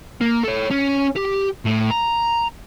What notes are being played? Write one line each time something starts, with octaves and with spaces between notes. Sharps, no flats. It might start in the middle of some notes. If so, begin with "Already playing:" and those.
A#3
A4 C#5
C#4
G4
A2
A#5